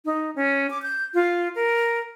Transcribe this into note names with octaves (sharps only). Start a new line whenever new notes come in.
D#4
C#4
D6
G6
F4
A#4